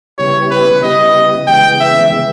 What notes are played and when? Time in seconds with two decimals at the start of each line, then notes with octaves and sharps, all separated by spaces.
0.18 C#3 G3 B3 E4 G4 C#5
0.50 B4
0.83 C#3 G3 B3 E4 G4 D#5
1.47 C#3 E3 G#3 B3 G5
1.80 E5
2.12 C#3 E3 G#3 B3